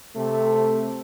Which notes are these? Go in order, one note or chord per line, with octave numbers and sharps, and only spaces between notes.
C3 A3